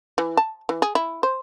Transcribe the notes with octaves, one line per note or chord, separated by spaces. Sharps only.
E3
A5
E3
G#4
E4
C5